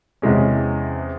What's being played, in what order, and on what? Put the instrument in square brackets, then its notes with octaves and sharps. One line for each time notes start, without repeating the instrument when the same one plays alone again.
[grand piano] E2 C3 E3 G#3 C#4